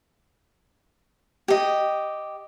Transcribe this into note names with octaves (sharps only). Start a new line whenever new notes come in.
G4 D#5